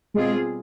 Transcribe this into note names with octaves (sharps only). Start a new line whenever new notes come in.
B2 G3 G#3 C4 F4 G#4